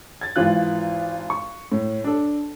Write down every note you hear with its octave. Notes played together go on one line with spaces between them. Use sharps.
G#6 A6
G#1 E3 F4 F#6
C#6
A2
D4 A4